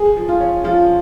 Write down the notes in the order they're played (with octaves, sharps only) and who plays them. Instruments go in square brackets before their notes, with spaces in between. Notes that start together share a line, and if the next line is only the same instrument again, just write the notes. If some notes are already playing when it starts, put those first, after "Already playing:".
Already playing: [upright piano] G#4
[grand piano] F3
[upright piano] F4
[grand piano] C#4
[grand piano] F3 [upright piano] F4